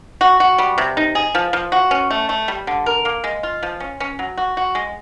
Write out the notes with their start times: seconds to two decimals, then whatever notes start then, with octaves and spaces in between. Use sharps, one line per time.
0.21 F#4
0.40 F#4
0.58 G3
0.78 C3
0.97 D#4
1.15 G#4
1.35 F3
1.53 F3
1.72 F#4
1.91 C#4
2.11 A3
2.29 A3
2.48 G3
2.67 D3
2.86 A#4
3.05 A#3
3.24 G#3
3.43 F4
3.63 F3
3.80 C#4
4.00 C#4
4.19 F#3
4.37 F#4
4.57 F#4
4.75 G#3